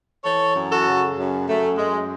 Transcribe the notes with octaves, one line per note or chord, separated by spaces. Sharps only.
E3 A4 C#5
F#2
F#4 A4
C#3
F#2
F#2 A3
F#2 G#3